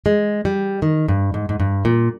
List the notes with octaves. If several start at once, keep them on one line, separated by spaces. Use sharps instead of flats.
G#3
G3
D#3
G2
G#2
G#2
G2
A#2